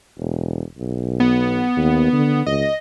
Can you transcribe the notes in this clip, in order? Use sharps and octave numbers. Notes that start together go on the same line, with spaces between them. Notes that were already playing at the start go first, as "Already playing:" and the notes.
E1
B1
B3
D#2
D3
C#2 D#5